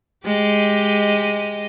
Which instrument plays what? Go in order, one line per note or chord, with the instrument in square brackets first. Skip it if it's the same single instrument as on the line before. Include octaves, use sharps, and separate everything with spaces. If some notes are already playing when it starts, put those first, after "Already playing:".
[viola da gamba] G#3 G4 D#5